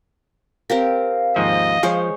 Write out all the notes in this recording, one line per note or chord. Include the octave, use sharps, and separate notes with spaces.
C4 G4 A#4 F5
D#2 G#2 F3 D#5
F3 G#3 C5 C#5